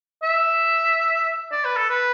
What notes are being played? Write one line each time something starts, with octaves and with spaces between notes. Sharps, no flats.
E5
D5
B4
A4
B4